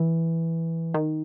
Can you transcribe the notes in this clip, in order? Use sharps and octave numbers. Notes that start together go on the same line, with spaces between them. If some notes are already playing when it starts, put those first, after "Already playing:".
Already playing: E3
D#3